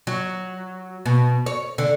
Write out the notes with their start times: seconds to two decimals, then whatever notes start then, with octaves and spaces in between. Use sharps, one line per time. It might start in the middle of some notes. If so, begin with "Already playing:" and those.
0.07 F#3
1.06 B2
1.46 C#5
1.78 D3